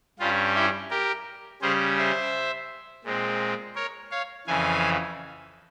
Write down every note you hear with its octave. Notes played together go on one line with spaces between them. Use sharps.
G2 G3 C#4 F4
E4 G4
G4 A#4
C#3 G3 C#4 G#4 C5
C5 E5
A#2 G#3 C4
A#4 C#5
C#5 F5
F2 C#3 E3 F5 G#5